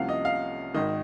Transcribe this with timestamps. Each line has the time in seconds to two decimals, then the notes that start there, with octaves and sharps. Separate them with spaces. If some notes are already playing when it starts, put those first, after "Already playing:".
Already playing: C2 C3 F3 A#3 C#4 F5 F#5
0.09 D#5
0.25 F5
0.74 G#1 G#2 D#3 D#5